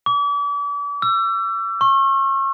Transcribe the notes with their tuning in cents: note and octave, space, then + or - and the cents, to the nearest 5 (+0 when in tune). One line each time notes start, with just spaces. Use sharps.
D6 -40
E6 +35
C#6 -35